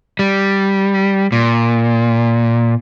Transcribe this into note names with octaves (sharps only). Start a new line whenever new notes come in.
G3
A#2